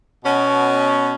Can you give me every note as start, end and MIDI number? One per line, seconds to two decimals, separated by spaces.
0.25 1.14 47
0.25 1.14 61